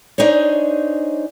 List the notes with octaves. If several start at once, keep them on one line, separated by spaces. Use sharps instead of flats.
D4 D#4 G#4 C5 C#5